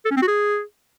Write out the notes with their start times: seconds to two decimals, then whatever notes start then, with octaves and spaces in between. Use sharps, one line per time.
0.05 A4
0.11 C#4
0.17 C4
0.22 F#4
0.28 G#4